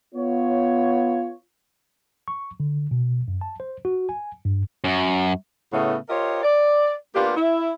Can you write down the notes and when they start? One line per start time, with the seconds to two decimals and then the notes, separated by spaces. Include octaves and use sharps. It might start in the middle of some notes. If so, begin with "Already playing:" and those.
0.15 B3 F4 C#5
2.28 C#6
2.60 D3
2.91 B2
3.28 F#2
3.41 A5
3.60 C5
3.85 F#4
4.09 G#5
4.45 G2
4.84 F#2
5.73 A2 C#3 A3 B3
6.09 F4 G4 A#4 C5 C#5 D#5
6.43 D5
7.16 A#3 B3 D4 F4 G4
7.36 E4